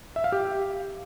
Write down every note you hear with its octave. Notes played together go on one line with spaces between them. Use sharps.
E5
F5
G4